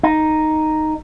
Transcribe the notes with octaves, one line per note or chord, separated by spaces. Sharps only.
D#4